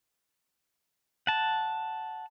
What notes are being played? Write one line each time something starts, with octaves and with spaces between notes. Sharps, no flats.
F#5 A5